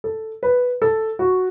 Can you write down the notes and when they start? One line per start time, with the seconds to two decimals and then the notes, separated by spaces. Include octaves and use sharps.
0.04 A4
0.43 B4
0.82 A4
1.19 F#4